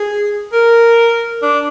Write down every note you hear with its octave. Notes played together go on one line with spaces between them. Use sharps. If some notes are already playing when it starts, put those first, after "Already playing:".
Already playing: G#4
A#4
D4